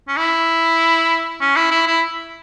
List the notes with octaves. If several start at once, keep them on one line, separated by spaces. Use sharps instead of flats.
C#4
E4
C#4
E4
E4
E4